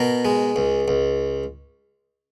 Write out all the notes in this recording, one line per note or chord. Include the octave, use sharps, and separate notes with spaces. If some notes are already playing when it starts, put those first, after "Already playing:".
Already playing: B2 A#4
G#3
C#2
C#2